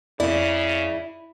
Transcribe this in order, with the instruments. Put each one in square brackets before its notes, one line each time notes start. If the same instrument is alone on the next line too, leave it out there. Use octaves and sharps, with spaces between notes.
[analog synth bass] F2 [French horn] C#3 [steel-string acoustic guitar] E4 [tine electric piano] D5